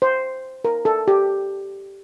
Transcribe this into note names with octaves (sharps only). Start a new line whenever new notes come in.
C5
A#4
A4
G4